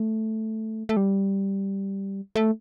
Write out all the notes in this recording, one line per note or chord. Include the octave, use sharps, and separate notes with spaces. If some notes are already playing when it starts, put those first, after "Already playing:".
Already playing: A3
A3
G3
A3